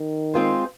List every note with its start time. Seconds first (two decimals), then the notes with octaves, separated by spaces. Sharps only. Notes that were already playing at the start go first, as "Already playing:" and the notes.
Already playing: D#3
0.34 G#3 C4 F4 G#4 C5